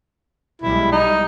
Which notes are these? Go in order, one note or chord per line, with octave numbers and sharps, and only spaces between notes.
B1 G3 G#3 E4
D#4